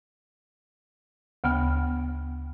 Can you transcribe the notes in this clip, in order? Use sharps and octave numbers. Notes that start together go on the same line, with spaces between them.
D2 C#3 B3 G5 F6